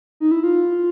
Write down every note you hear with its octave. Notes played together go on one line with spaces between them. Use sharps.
D#4
E4
F4